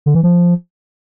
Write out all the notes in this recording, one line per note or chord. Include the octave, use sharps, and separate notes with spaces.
D3
E3
F3